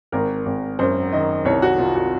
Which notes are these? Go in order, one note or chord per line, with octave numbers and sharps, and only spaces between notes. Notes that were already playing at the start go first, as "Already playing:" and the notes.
G#1 A#4
G#1
F#2 C5
D#3 D#5
C2 C#5
F#4
C2 F4
F#4